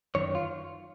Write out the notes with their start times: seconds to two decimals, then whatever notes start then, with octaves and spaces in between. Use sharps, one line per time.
0.15 F#2 D#3 C#5
0.35 F4